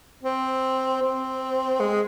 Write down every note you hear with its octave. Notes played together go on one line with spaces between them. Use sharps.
C4
C4
G#3